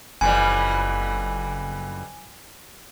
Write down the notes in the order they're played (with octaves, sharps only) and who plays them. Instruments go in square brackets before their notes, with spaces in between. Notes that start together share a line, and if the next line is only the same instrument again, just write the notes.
[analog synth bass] F#1 [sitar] F2 E3 G3 [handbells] G#5